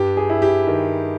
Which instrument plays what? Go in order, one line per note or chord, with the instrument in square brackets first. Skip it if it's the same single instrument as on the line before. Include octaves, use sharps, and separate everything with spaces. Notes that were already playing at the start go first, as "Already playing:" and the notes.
Already playing: [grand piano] G2 G4
G#4
E4
G4
D#3